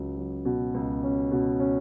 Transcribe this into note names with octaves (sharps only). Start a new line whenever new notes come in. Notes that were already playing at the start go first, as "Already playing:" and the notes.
Already playing: C#2 F#3
F#3
B2
C#2
C#4
B2
C#4